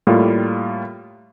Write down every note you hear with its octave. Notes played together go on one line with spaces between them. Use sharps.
A2 G3 A#3 F4